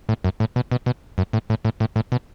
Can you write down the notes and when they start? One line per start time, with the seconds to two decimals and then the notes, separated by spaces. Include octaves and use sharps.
0.09 A2
0.24 F#2
0.40 A2
0.56 B2
0.71 B2
0.86 B2
1.18 F#2
1.33 A2
1.50 A2
1.65 A2
1.80 A2
1.96 A2
2.12 B2